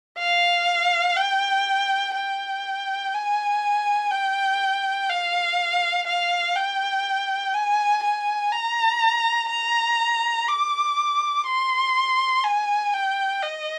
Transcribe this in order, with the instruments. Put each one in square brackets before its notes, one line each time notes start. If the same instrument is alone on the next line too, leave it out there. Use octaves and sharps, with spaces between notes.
[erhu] F5
G5
G5
G#5
G5
F5
F5
G5
G#5
G#5
A#5
A#5
D6
C6
G#5
G5
D#5